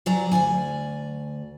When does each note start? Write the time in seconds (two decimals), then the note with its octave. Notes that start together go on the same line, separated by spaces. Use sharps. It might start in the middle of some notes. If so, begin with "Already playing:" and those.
0.06 C3 F#3 D5 G#5 A#5
0.31 D2 G#2 D5 G#5